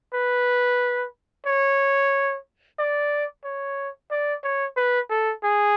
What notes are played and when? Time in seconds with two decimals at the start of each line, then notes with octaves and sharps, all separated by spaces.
0.14 B4
1.46 C#5
2.79 D5
3.44 C#5
4.11 D5
4.44 C#5
4.77 B4
5.10 A4
5.44 G#4